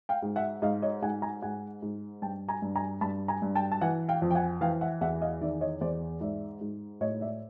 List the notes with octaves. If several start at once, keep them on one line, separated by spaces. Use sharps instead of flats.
F5 G5
G#2
E5 F#5
G#2 D#5 F5
C#5 D#5
G#2 F#5 G#5
G#5 A#5
G#2 F#5 G#5
G#2
G2 G5 A5
G#5 A#5
G2
G#5 A#5
G2 A5 B5
G#5 A#5
G2
G5 A5
A5
E3 F#5 G#5
F5 G5
F2
G5
F#5 G#5
E3 F5 G5
E5 F#5
E2 E5 F#5
D#5 F5
D#3 D5 E5
C#5 D#5
E2 C5 D5
G#2 D5 E5
G#2
A2 C#5 D#5
D5 E5